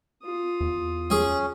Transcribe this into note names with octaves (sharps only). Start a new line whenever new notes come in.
F4 D#6
E2
C#4 G#4 G#5